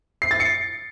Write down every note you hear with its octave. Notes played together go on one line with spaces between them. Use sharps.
C7
A6
C#7